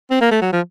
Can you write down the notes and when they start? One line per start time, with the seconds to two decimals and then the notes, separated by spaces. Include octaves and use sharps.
0.11 C4
0.21 A#3
0.31 A3
0.42 F#3
0.53 F3